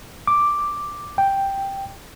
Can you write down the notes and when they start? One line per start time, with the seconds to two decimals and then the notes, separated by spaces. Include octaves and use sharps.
0.27 D6
1.18 G5